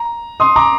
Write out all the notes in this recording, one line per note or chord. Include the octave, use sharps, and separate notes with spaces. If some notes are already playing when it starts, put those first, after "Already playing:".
Already playing: A#5
C6 D#6
A#5 D6